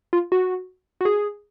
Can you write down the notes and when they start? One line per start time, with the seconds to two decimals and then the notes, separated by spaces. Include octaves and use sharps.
0.13 F4
0.32 F#4
1.01 F#4
1.05 G#4